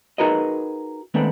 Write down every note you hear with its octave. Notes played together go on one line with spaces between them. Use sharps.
D#4 F#4 G#4 A#4 B4 D#5
D#3 G#3 A3 B3 C4 D4